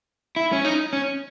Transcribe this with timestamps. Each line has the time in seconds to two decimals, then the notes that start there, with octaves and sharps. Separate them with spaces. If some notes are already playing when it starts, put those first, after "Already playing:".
0.36 E4
0.53 C#4
0.65 D#4
0.93 C#4